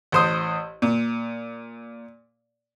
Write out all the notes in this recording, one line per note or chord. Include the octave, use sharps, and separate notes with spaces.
A1 C5 D#6
A#2